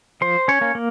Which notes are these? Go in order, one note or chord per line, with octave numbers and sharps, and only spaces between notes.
F3 C5 C6
C#4 C#5
A#3 C#4
A#3